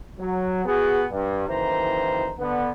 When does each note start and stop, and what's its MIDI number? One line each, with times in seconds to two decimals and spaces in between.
0.19 0.63 54
0.66 1.03 59
0.66 1.03 66
0.66 1.03 68
1.11 1.44 43
1.48 2.31 30
1.48 2.31 51
1.48 2.31 52
1.48 2.31 72
1.48 2.31 82
2.39 2.70 50
2.39 2.70 59